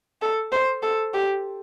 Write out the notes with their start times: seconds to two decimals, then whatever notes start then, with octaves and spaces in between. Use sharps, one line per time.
0.22 A4
0.52 C5
0.82 A4
1.14 G4